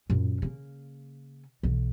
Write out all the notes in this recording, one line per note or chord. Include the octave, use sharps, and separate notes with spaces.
F#2 A#2
C#3 A#3
B1 E3